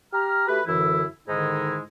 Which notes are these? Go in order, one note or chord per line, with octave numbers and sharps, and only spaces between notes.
G4 A#5 F6
A3 F#4 G4 B4
F#2 D3 E3 E4
G#2 D3 D#3 G#3 D#4 E4